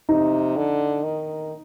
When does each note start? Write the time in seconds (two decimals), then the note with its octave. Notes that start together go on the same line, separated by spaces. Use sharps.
0.09 C3 D#4
0.56 D3
1.03 D#3